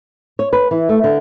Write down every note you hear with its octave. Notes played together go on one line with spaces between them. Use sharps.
C#5
B4
E3
A3
D3